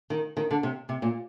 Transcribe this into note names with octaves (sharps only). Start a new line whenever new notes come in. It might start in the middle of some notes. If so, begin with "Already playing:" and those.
D#3
D#3
D3
C3
C3
A#2